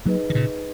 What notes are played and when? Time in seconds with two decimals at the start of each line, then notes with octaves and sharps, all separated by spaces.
0.05 F#3 A#3 D#4 G#4 B4 D#5
0.30 D#3
0.35 A#2 C#3